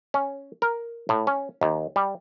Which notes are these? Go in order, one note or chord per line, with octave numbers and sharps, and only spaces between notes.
C#4
A#4
A2
C#4
D#2
G3